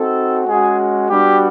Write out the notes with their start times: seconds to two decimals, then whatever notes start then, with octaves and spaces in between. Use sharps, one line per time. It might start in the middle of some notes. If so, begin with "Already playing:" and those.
Already playing: C4 D#4 F#4 A4
0.45 G#3 C#4 F#4 G#4
1.09 G3 B3 D4 F#4 G4